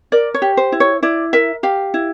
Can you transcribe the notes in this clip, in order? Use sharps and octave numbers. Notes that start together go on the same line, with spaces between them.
A#4 D5
C#5
G4
C5
E4
C#5
E4 D5
A#4 E5
G4 F5
E4